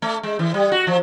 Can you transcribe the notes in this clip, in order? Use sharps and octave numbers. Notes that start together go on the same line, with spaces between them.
A3
G#3
E3
G3
F#4
F3